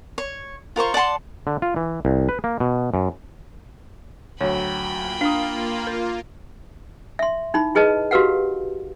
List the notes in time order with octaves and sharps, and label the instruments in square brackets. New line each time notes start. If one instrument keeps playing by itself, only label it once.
[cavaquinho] C#5
F4 A#4 C5 C#6
D5 F#5 A5 C6
[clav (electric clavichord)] D3
F4
E3
C2
B4
A#3
B2
F#2
[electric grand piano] D2 F#3 [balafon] C#5 [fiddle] G5 B5
[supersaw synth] A#3 F4
[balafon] D4 [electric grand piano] F5 A#5 D#6
[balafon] A#4
[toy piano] E5 C6
D#4 E4 B5
E4 G#4 B4 D#5 A5
F#4 G4 A#4 B4 F5 F#5